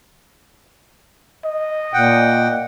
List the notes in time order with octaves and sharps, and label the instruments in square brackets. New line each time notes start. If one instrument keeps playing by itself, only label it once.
[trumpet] D#5
[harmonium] A#2 F#5 G5